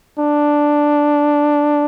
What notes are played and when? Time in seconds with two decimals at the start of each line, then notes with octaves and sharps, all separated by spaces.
0.19 D4